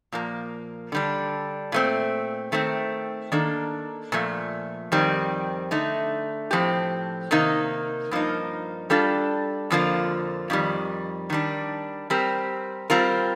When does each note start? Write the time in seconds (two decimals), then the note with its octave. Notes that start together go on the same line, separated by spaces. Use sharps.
0.12 A#2 F3 A#3
0.92 D3 G3 D4
1.72 A#2 A3 C4
2.52 D#3 A3 C4
3.32 D#3 A#3 D4 A4
4.12 A#2 F3 A3
4.92 F2 D#3 G3 C4
5.71 D3 A3 D#4
6.51 A2 F3 C4 G4
7.31 C3 D#3 A#3 D#4
8.11 G2 F3 A#3 D#4
8.90 G3 D4 F4 A4
9.70 F2 D3 F3 A#3 F4
10.50 F2 D#3 G3
11.30 D#3 G3 D4
12.10 G3 C4 G4 A#4
12.90 G3 C4 F4 A#4